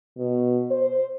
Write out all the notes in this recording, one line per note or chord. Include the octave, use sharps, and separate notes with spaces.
B2
C5